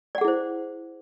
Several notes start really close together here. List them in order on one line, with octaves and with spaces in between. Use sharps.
D5 F#5 G#4 E4 C5